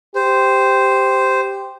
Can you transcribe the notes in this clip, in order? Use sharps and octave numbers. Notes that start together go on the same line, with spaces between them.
G4 C5